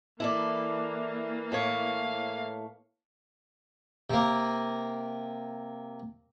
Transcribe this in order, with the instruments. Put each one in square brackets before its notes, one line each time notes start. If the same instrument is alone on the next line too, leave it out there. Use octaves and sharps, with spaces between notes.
[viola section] E3 A#3 [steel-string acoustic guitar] E4 A4 D5
[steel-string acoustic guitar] A2 A3 C#5 [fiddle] F5
[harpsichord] C3 A#3